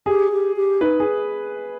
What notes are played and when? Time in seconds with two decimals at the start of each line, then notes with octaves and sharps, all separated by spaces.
0.06 G4 G#4
0.31 G4
0.56 G4
0.81 D#4 B4
1.00 G#4